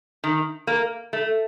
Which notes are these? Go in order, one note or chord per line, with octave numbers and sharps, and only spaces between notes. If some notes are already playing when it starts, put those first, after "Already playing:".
D#3
A#3
A3